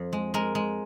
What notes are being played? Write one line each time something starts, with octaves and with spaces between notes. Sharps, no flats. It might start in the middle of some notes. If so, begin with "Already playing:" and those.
Already playing: F2
G#3
G#3 A#4
G#3